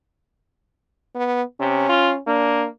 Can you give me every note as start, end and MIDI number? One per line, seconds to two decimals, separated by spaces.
1.15 1.43 59
1.60 1.85 48
1.60 2.19 61
1.89 2.13 65
2.27 2.67 58
2.27 2.66 62